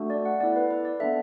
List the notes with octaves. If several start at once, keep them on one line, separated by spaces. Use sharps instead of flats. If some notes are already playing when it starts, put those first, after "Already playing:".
Already playing: A3 D4 F#4 A4
D5
F#5
B3 E4 A4 D5
B4
B4
D5
B3 D4 A4 E5